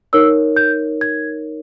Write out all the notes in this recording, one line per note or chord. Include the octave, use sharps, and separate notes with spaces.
D#4 A#4 C#5 E6
G6
G#6